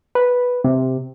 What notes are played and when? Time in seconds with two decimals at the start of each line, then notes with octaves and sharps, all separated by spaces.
0.15 B4
0.64 C3